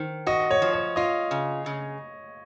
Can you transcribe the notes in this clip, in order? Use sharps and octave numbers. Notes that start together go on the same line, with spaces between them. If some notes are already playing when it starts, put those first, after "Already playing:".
Already playing: D#3 C5
F#4 D#5
C#5
F3
C#5
F4 D#5
C#3
C#3